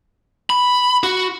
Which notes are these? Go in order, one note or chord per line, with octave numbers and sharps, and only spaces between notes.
B5
F#4